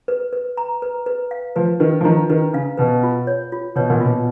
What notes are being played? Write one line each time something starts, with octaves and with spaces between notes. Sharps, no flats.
B4
B4
A#5
B4
B4
F5
F3 B4
D#3 B4
F3
D#3 A#5
D#3 B4
C#3 F5
B2 B4
F4
C#5
F4
B2 C#5
A#2
B2 F4